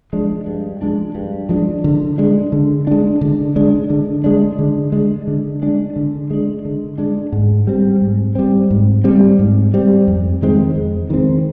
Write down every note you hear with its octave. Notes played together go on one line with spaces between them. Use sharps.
F3 G#3 D4
G2
F3 G#3 D4
G2
F3 G#3 D4
D3
G#3 D4
D3
G#3 D4
D3
G#3 D4
D3
G#3 D4
D3
G#3 D4
D3
G#3 D4
D3
G#3 D4
D3
G#3 D4
G#2
G3 C4
G#2
G3 C4
G#2
G3 C4
G#2
G3 C4
F2
D#3 G#3 C4
F2
D#3 G#3 C4